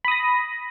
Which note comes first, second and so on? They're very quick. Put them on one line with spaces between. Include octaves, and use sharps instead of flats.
B5 D#6 A#6